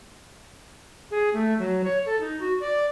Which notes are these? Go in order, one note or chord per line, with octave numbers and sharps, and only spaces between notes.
G#4
A3
F#3
C#5
A4
D#4
F#4
D5